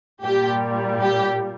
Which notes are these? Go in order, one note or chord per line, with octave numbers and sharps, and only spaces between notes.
A#2 G3 G4
G4